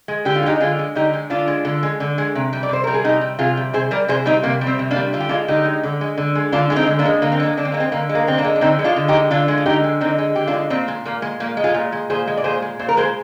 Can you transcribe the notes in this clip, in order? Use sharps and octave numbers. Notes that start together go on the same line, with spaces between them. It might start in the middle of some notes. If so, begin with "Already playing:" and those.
G#3
D3 G4
F4
G#3 D#4 G4
D3 F4 G#4
G#3
D3 D#4 G4
G#3
D3 D4 F4
G#3
D3
G#3
D3
G#3
C3
G3
D5
C3 C5
G3 A#4
G#4
C3 D#4 G4
G3
C3 F4 G#4
G3
C3 G#4 C5
G3 A#4 D5
C3 G#4 C5
G3 C4 D#4
C3 A#3
G3
C4
C3
A#3 D4
G3
D3 F4
G4
G#3 D4 F4
D3 D#4 G4
G#3
D3
G#3
D3
G#3
D3 D4 F4
G#3 F4
C4 D#4
D3
A#3 D4
G#3
D3 A#3
C4
G#3 A#3
D3 D4
C4
G#3 A#3
C4
D3 A#3
G#3
A#3
D3 C4
A#3 D4
G#3
D4
D3 C4 D#4
G#3
D4 F4
D3
D#4 G4
G#3
D3 D4 F4
G#3
F4
D3 D#4 G4
G#3
D3 C4 D#4
G#3
D3 G4
D4 F4
G#3
A#2 C4
G#3
A#2 A#3
G#3
A#2 A#3
G#3
F4 G#4
A#2
G#3
A#2 G#4 C5
G#3
D5
A#2 G#4 C5
G#3
A#2 C5
A#4
G#3 G#4 C5